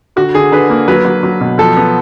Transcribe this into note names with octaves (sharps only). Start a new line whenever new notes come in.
D3 F#4
D3 G#4
D3 B4
A#3
F#3 B4
F#3
F#3
B2
F3 A4
B3